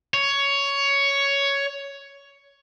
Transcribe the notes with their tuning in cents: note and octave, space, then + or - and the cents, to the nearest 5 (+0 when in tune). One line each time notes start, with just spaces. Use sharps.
C#5 +10